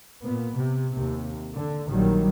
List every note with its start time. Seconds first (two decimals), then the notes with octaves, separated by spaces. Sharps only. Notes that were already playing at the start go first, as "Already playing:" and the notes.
0.22 A#2 B3
0.55 C3
0.93 D#2 C3
1.56 D3
1.90 A#1 D#3 F#3 G3